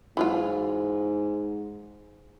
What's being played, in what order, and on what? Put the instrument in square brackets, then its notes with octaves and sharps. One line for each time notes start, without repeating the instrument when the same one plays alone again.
[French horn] G#2 [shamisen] E3 F#3 F4